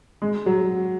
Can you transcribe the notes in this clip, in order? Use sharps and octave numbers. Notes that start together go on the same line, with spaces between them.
G#3
F#3